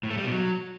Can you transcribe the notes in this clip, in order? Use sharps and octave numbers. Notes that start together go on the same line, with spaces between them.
A2
A3
G3
B2
F#3